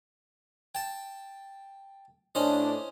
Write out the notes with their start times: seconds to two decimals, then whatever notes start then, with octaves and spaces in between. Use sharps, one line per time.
0.75 G5 A5
2.35 A2 C#4 D4 C5 D#5